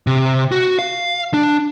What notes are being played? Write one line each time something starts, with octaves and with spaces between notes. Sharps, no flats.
C3
F#4
F5
D4